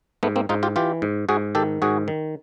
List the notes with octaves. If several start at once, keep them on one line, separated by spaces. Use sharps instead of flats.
G#2 A3 B3
A#3 C4
G#2 D#4 F4
F4 G4
E3 F4 G4
G#2
G#2 F#4 G#4
D#3 G4 A4
G#2 F#4 G#4
D#3